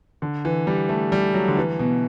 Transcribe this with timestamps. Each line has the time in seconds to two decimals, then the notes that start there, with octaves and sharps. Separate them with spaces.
0.22 D3
0.45 E3
0.67 G3
0.89 A3
1.12 G3
1.34 F#3
1.48 D3
1.57 E3
1.79 B2